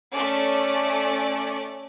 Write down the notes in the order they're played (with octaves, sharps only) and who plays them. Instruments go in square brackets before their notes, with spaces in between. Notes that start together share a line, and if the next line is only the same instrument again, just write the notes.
[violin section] A3 C#4 A4 D5